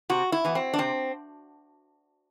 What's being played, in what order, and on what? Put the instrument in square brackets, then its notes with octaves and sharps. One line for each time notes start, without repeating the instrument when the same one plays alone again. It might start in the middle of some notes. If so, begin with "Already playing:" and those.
[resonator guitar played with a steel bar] C3 F#4
E4
E3 B3
C4
D4
C3 C4